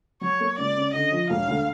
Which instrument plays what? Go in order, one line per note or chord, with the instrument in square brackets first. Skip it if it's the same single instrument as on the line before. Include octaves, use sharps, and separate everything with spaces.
[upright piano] F#3 [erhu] C#5
[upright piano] A#3
[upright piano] C#2 [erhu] D5
[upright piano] C#3
[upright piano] D3 [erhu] D#5
[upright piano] F3
[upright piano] E1 [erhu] F5
[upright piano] D2